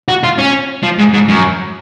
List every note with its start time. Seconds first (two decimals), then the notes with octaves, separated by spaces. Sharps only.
0.09 F#4
0.23 F4
0.38 C#4
0.83 F3
0.99 G#2
1.14 G#2
1.29 F#2